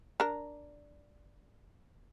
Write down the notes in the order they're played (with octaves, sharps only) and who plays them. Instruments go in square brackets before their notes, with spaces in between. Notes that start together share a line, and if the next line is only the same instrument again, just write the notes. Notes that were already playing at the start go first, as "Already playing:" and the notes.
[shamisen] D4 A#4